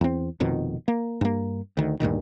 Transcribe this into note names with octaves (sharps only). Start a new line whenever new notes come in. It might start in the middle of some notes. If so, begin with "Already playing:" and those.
E2 C4
F1 F2 B2 D#3
A#3
G2 A#3
D2 D#3
D2 G2 A#2 D#3